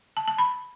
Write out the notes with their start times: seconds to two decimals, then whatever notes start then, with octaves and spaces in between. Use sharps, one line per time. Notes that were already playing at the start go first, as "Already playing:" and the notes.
0.17 A5
0.28 A5
0.38 B5